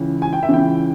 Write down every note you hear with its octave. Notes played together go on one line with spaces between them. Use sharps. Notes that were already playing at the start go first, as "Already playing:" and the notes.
Already playing: C#2 C#3 E3
G#5
G5
E5
C#2 C#3 E3 G5